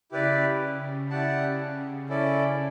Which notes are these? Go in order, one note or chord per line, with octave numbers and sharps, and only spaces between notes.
C#3 E4 G4 B4 D5
C#3 E4 G4 D5 F#5 A5
C#4 E4 A4 D5